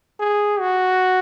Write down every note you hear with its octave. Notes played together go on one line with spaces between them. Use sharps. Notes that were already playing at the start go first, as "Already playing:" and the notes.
G#4
F#4